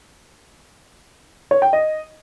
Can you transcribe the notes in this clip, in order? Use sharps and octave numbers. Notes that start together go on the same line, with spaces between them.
C#5
G5
D#5